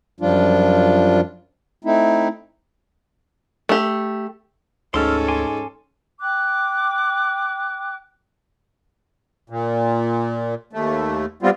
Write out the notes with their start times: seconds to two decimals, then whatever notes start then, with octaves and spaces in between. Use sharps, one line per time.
0.20 F#2 F3 G3 D4 F4
1.85 A3 C4 D#4 E4
3.69 A3 G4
4.94 D2 G#2 C#4 A4 C6 E6 F6
5.28 G#5 C6 D6
6.21 G5 D6 F#6
9.50 A#2
10.73 D#2 A3
11.43 G3 B3 C4 F4